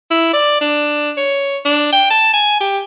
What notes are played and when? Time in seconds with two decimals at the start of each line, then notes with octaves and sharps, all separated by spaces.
0.10 E4
0.33 D5
0.61 D4
1.17 C#5
1.65 D4
1.92 G5
2.10 A5
2.33 G#5
2.60 G4